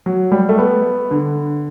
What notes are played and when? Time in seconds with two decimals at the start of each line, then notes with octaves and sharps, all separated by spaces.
0.06 F#3
0.32 G3
0.49 A3
0.58 B3
1.11 D3